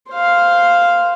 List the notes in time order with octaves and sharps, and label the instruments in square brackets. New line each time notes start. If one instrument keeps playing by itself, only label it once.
[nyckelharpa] C5 F5